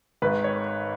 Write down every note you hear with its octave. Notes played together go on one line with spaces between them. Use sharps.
G#1 G#2 D#3 B4
C#5